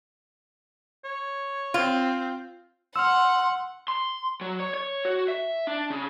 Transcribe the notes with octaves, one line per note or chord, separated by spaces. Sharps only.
C#5
C4 F4
F#5 C6 E6 F6
C6
F#3
C#5
C#5
F#4
E5
D4
C#3